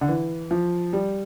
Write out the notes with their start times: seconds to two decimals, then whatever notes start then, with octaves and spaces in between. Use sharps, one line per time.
0.01 D3
0.08 E3
0.51 F3
0.93 G3